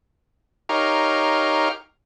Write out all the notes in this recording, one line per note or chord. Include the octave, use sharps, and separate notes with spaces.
D#4 G4 A#4 C#5 F5